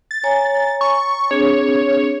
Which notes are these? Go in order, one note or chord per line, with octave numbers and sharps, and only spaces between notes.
A6
C#5 G#5 A#5
C#6
C4 D4 G#4 C#5